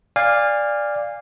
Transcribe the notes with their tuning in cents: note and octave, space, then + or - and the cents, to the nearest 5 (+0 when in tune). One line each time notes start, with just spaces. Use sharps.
D5 +0 F5 +0 G#5 -30